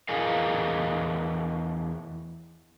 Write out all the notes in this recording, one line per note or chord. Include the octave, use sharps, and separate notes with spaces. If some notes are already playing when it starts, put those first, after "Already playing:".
E2 G#4 A#4 D#5 F5